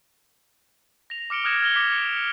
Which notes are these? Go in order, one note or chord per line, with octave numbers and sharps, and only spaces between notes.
A#6 F7
D6 F6 C#7 D7 G7
D#6 F6 F#6 G#6 A#6 E7
F6 A#6 G7
D6 B6 C#7